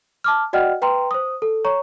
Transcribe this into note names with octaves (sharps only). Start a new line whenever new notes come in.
A5 D6 F6
F#4 D5 D#5 F#5 G5 F6
B4 G5 A#5 C6
C5 D#6
A4
C#5 A#5 C#6